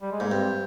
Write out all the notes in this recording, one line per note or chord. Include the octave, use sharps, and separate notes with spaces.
G3
G#3
G#2 A#3
G2 C4